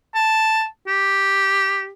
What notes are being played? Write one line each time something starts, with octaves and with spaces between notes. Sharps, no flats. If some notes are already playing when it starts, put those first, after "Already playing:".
A5
G4